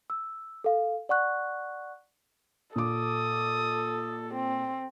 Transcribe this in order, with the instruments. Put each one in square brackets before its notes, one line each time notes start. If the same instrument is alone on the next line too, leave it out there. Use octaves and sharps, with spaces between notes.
[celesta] E6
A4 F5
D5 F#5 C#6 F#6
[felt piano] A#2 D6 [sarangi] A4 [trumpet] D#6
[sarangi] C4